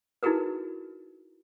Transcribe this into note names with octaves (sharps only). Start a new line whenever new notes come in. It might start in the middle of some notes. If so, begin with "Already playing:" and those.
D#4 E4 F#4 G#4 A#4 B4